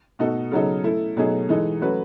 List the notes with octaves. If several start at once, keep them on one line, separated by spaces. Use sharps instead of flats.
B2 A3 D#4 F#4 A4
C#3 F#3 B3 D#4 A4
A3 E4 A4
B2 F#3 A3 D#4 G#4
E3 G#3 D#4 A4
F#3 A3 C#4 F#4 B4